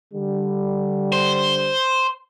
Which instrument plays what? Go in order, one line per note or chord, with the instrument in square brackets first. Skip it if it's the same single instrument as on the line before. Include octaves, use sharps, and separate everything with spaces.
[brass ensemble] D3 G3
[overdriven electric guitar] C5